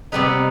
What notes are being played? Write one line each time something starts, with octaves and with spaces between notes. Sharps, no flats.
C3 G3 B3 D#4 B4